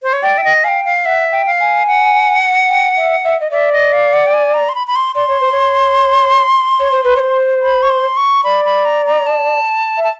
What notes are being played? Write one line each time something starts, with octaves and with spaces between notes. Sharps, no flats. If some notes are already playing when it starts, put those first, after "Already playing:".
C5
C#5
D5 G5
E5
D#5
F5 G5 G#5
F5
E5 F#5
G5
F5
G#5
F#5
G5
E5
E5
D#5
D5 E5
D#5
F5
F#5
G5
G#5
A#5
C6
B5
B5
C6
D5 C6
C#5
C5
C#5
C#5
C5
B4
C#5
C5
B5
C#6
C6
C#6
D5 B5
B5
A#5
A#5
A5
E5
A5